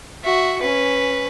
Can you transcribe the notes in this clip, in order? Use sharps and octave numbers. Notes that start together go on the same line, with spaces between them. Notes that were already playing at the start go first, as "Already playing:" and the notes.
F#4 E5
C#4 B4